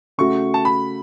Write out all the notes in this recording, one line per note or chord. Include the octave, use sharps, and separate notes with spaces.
C#3 A3 F#4 C#6
A5
B5